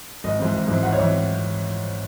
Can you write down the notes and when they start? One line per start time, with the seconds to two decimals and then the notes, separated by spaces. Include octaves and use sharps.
0.24 G#1 D#5
0.39 G#2 E3 C4
0.54 G#1
0.68 G#2 E3 C4
0.83 G#1 F#5
0.92 C#5
0.99 E3 C4